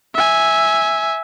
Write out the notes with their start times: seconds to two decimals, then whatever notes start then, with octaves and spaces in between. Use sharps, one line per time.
0.15 E5 G#5